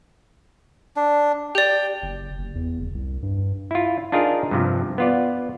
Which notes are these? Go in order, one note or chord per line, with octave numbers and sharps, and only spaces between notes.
D4
G4 D5 G5
F#1
F#1
E2
F#1
C2
G2
E4 F4
D4 D#4 F4 G#4 A#4
G2 C3 F3
B3 F4 D5